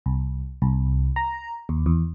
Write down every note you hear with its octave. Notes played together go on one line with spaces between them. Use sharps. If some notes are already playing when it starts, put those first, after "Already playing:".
C2
C2
A#5
D#2
E2